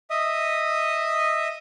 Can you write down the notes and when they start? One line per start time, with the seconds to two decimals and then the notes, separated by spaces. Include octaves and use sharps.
0.10 D#5 E5 D#6